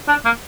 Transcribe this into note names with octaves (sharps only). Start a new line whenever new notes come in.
D4
A#3